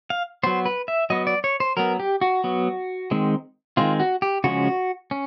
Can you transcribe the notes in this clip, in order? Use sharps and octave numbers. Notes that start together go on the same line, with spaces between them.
F5
F#3 B3 C5
B4
E5
F#3 B3 D#5
D5
C#5
C5
F#3 B3 A#4
G4
F#4
F#3 B3
D#3 G#3 C4
D#3 G#3 C4 F4
F#4
G4
C#3 F3 G#3 C#4 F#4
C#4